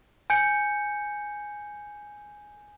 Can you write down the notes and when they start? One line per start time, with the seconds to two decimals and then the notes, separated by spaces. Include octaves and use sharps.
0.30 G#5 G6 C#7